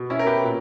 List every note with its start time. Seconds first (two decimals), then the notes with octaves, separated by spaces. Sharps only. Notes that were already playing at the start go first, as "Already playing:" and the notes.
Already playing: B2
0.10 C#4 E4
0.19 A#4
0.26 G4 B4
0.43 A#2